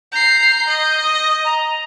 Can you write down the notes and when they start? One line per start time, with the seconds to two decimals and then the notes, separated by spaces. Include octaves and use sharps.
0.12 A#5 G6 C7
0.68 D#5
1.03 D#6
1.44 A#5